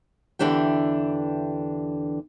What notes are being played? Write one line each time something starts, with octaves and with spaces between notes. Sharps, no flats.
E2 D3 E3 D4 G4 G5